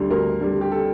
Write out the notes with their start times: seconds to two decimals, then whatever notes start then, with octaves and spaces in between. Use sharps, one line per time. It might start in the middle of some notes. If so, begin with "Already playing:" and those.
Already playing: D2 D3 G3
0.10 D2 A#4
0.41 D3 G3
0.61 G4
0.72 A4